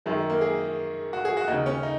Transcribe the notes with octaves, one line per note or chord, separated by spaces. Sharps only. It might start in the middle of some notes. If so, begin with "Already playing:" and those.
F#2 D#3 G#3
A#3
G#4
F#4
G#4
F#4
D#2 C#3 D#4
C#4
D#4